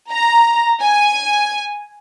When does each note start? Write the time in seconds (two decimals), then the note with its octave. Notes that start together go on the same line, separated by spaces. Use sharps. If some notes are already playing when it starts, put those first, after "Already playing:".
0.10 A#5
0.82 G#5